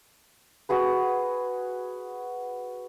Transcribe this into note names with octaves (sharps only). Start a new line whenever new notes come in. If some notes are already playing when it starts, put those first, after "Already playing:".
F#4 G#4 B4